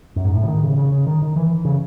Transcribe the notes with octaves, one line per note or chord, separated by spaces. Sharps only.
F#2
G#2
A2
C#3
D#3
C#3
C#3
C#3
D#3
D#3
E3
C#3